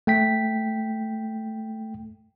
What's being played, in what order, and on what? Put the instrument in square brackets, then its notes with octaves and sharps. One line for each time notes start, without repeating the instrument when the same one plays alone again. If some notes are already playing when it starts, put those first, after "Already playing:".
[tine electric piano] A3 G5 B6